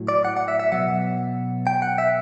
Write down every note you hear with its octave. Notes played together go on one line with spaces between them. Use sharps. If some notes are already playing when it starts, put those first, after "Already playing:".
Already playing: A2 F#3
D5
F#5
F#5
E5
E5
B2 F#3 F#5
G5
F#5
E5